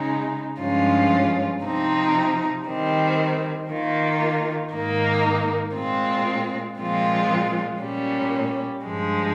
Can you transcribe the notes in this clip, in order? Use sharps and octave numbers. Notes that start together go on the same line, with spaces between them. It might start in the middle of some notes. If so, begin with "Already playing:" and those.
Already playing: C#3 G#3 D#4
G2 F3 G#3 C#4 F4
C3 F3 C4 D#4
D#3 G3 C4
D#3 A#3 F4
G#2 D#3 A#3 D#4
A#2 G#3 C4 F4
A#2 F3 G#3 C4 F4
A#2 G3 C#4
G2 F3 G#3